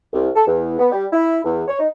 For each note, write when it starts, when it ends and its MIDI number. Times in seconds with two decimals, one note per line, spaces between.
0.13 0.30 36
0.36 0.43 69
0.47 0.78 40
0.79 0.88 59
0.92 1.05 55
1.13 1.39 64
1.45 1.63 40
1.68 1.75 73
1.80 1.88 63